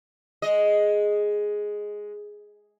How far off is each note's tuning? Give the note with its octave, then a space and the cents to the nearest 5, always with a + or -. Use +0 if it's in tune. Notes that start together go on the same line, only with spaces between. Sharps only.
G#3 +0 D#5 +0